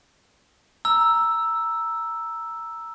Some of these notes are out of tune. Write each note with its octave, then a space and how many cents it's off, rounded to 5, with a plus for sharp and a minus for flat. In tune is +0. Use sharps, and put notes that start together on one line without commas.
A#5 +0 E6 +0